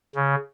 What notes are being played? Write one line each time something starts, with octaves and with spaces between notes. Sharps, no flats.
C#3